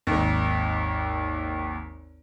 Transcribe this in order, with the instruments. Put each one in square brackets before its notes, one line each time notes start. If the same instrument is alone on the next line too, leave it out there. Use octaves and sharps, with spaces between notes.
[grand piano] G#1 D#2